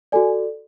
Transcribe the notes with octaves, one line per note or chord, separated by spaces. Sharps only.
F#4 A4 D5 G#5